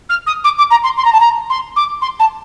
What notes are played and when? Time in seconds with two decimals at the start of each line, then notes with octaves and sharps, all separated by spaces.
0.09 F6
0.26 D#6
0.44 D6
0.58 D6
0.70 A#5
0.83 C6
0.97 C6
1.04 A#5
1.12 A5
1.20 A#5
1.50 C6
1.76 D6
2.01 C6
2.19 A5